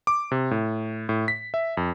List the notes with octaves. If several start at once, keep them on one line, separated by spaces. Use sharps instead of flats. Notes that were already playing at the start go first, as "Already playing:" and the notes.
D6
C3
A2
A2
B6
E5
F2